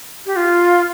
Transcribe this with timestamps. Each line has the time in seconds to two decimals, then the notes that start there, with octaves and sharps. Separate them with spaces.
0.26 G4
0.36 F4